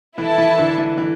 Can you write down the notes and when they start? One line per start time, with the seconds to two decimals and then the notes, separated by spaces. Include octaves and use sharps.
0.18 E3 E4 A4 E5 A5
0.38 E3
0.58 D3
0.78 E3
0.98 E3